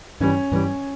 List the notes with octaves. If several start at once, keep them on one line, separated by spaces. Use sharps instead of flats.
G2 E3 G3 C#4
G2 E3 G3